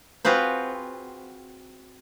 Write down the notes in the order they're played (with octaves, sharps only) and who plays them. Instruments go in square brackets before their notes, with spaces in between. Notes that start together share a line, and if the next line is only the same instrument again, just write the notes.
[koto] C4 F4 F#4 G#4 B4 C5